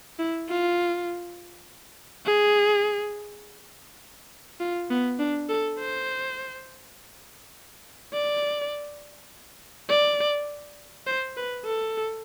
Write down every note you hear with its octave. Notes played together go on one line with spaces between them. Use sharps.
E4
F4
G#4
F4
B3
D4
A4
C5
D5
D5
C5
B4
A4